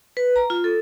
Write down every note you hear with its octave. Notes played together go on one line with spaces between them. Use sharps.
B4
A#5
F4
A4